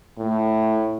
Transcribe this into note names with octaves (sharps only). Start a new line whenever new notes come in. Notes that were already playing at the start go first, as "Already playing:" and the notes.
A2